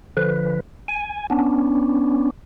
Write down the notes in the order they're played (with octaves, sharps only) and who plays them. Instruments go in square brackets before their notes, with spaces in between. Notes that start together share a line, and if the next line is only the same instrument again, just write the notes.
[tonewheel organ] D3 F3 B4
G#5
B3 C#4 D4